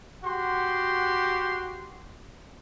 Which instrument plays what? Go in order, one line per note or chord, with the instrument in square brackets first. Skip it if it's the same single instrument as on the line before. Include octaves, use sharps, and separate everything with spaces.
[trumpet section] F#4 G4 F#5 C6